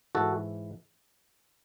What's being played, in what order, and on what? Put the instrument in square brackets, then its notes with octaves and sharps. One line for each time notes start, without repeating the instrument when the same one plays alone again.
[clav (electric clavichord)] G#2 E3 F#4 A4